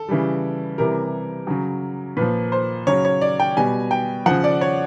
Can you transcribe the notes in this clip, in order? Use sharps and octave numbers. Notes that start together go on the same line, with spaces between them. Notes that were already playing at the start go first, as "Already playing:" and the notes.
Already playing: A4
C#3 E3 G3
C3 E3 G3 A#4
C#3 F#3
A#2 F3 B4
C5
C#3 F#3 C#5
C#5
D5
G5
B2 G3 G#5
G5
C#3 F3 F#5
D5
C#5